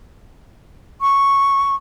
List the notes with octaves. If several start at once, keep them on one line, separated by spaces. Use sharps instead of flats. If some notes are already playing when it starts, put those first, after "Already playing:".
C#6